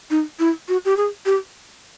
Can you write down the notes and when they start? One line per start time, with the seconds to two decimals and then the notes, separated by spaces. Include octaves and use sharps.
0.11 D#4
0.39 E4
0.69 F#4
0.85 G4
0.97 G#4
1.26 G4